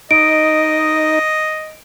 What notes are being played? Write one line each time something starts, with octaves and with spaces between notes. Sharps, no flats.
D#4 D#5 D7